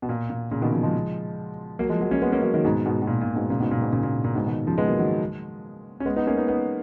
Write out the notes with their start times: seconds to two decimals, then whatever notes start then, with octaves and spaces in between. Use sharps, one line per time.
0.02 B2
0.09 A#2
0.30 A#2
0.51 A#2 C#3
0.62 B2 D#3
0.72 C#3 F3
0.83 F3 G#3
1.79 F#3 A#3
1.89 F3 G#3
2.00 F#3 A#3
2.11 A#3 C#4
2.22 G#3 B3
2.32 A#3 C#4
2.43 F#3 A#3
2.54 D#3 F#3
2.64 G#2 B2
2.86 G#2 B2
3.02 B2
3.07 A#2
3.21 A#2
3.36 G#2 B2
3.50 A#2 C#3
3.60 G#2 B2
3.71 A#2
3.82 G#2 B2
3.93 A#2 C#3
4.03 A#2
4.24 A#2
4.35 G#2 B2
4.46 B2 D#3
4.67 C#3 F3
4.78 G#3 B3
4.88 F#3 A#3
4.99 D#3 F#3
6.00 C#4
6.05 G#3 B3
6.16 B3 D#4
6.27 A#3 C#4
6.37 B3 D#4
6.48 B3 D#4